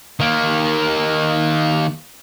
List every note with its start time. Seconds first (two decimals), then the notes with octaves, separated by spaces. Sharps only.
0.20 D#3 A#3